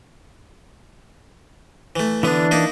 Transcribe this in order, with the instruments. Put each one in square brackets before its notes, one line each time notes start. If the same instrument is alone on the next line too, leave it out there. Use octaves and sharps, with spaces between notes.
[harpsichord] E3 A3
[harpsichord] D3 B3 [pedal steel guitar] E3 D4
[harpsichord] A#3 D#4 E4